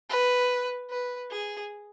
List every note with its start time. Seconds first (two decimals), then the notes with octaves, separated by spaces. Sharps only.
0.09 B4
0.90 B4
1.31 G#4